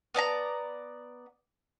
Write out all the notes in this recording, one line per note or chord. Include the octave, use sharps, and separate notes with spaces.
B3 D5 G#5 A#5